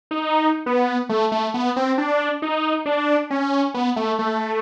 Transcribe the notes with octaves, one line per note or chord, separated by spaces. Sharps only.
D#4
B3
A3
A3
B3
C4
D4
D#4
D4
C#4
B3
A3
A3